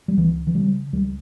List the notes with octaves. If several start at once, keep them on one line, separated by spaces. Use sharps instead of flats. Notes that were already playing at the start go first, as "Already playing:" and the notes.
G3
C#2 E3
E3
C#3 G3
C#2 G3